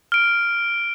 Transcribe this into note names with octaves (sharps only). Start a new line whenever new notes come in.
F6 D7